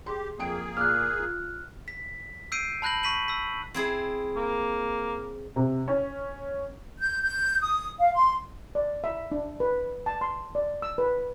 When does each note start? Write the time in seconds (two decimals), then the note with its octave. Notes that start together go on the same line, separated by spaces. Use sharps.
0.06 G4 G#4 C6
0.39 F2 A#3 G#4 G5 D7
0.77 A#2 F5 D6 F6 F#6
1.19 F4
1.88 B6
2.52 E6 G6 C7 D7 D#7
2.82 A5 B5 F#6 G6 A#6 F#7
3.03 C#6 B6 D#7 F#7
3.28 E6 B6
3.74 C4 E4 G#4
4.36 A#3
5.56 C3
5.88 C#4
6.99 G6
7.22 G6
7.60 D#6
7.98 F5
8.13 C6
8.75 D5
9.04 E5
9.32 D4
9.60 B4
10.06 A5
10.21 C6
10.55 D5
10.82 E6
10.98 B4